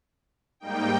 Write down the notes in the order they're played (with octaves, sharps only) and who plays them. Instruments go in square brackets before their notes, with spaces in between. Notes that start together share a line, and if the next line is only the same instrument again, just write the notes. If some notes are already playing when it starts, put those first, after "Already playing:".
[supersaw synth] G#2 G3 A#3 D#4 G5